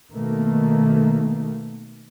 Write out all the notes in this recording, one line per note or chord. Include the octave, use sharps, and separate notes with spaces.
B2 D#3 A3 A#3